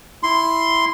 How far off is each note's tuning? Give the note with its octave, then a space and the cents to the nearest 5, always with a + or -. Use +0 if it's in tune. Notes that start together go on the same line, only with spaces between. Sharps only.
E4 +0 C6 +0